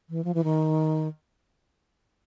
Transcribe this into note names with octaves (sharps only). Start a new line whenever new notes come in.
E3
F3
E3
D#3